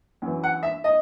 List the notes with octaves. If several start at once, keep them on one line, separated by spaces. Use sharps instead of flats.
F#2 E3
F#5
E5
D#5